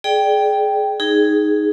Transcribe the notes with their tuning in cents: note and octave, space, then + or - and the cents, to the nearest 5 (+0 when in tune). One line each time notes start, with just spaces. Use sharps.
G#4 +25 D5 +10 G5 +0
D#4 +0 G#4 +0